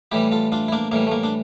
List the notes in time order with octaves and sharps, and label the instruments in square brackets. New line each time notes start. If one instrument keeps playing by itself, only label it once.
[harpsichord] A2 E3 G3 E4 G4
F4 A4
D4 F4
E4
A#3 D4
A2 E3 G3 A#3
A3
A#3
D4